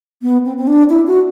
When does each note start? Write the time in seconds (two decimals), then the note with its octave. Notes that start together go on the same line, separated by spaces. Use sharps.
0.22 B3
0.46 C4
0.57 C4
0.67 D4
0.90 E4
1.07 F#4